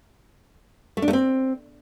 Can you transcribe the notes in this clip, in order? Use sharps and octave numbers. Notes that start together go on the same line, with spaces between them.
A3
D4
A3
C4